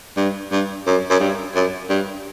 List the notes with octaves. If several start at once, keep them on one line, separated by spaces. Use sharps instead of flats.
G2
G2
F#2
F#2
G2
F#2
G2